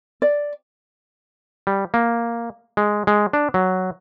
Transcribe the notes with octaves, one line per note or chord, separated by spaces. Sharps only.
D5
G3
A#3
G#3
G#3
D4
F#3